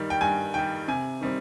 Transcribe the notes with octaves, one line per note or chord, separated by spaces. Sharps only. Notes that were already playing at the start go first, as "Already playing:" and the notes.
Already playing: G2 D#3 G3
G5
G2 G#5
D#3 G3 G5
C3 G#5
D#3 G3 C4